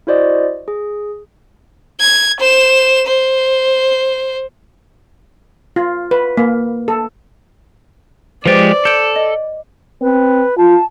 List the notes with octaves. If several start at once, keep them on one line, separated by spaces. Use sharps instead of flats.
E4 F#4 C5 D5 D#5
G#4
G#6
C5 E7
C5
F4
B4
A#3
A4
F3 G#3 G4 B4 C5 D5 A6
A4 G6 D7
D#5
C4 B4
F4 A5